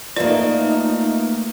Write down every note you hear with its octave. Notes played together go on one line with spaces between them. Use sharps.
A3 A#3 D#4 F4 B4 D5 E5